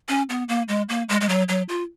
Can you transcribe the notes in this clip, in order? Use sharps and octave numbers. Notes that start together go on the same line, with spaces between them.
C#4
B3
A#3
G#3
A#3
G#3
G#3
F#3
F#3
F4